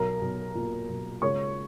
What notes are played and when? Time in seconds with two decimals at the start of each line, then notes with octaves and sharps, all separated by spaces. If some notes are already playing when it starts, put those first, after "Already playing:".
Already playing: B1 A#4 A#5
0.21 B1
0.55 A#2
0.89 B1
1.22 C#2 C#5 C#6